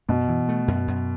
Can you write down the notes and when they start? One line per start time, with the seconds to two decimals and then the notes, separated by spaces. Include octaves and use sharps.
0.09 F#2 B2
0.29 E3
0.49 A3
0.68 F#2
0.88 F#2